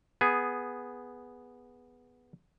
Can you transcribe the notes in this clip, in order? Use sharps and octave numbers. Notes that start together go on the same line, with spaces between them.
B3 G#4